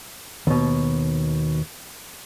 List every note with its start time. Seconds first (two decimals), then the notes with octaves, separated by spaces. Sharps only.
0.47 D#2 B2